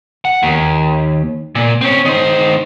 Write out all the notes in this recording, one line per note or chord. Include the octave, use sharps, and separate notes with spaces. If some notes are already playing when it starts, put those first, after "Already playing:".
F#5
D#2
A#2
C4 C#4
D#3 C5